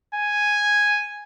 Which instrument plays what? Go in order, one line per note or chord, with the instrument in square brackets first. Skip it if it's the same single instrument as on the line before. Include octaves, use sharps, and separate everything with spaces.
[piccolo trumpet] G#5